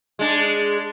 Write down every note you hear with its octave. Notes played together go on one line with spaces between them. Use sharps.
G#3 D4